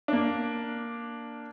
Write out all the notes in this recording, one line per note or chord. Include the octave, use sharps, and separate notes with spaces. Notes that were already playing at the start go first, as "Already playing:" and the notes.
A#3 D4